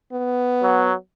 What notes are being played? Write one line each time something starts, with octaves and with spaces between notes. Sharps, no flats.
B3
F#3